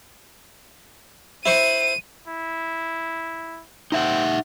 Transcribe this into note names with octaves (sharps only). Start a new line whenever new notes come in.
E4 C5 C#6 D#7
E4
C4 D#4 E5 F#5